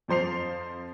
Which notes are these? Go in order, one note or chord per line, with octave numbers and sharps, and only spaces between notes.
F2 F3 C5 C7 F7